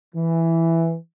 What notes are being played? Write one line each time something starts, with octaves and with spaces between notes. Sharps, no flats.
E3